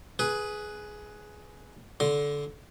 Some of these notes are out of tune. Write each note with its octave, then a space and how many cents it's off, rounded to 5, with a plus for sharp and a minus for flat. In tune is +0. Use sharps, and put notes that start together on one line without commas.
G#4 +15 B4 +0
D3 -20 C6 +0